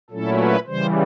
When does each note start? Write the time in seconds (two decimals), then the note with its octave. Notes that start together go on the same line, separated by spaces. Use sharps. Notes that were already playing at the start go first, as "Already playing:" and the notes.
0.10 A#2 F#3 A3 C#4 E4 A4
0.39 B4
0.67 C#3 E3 G3 C5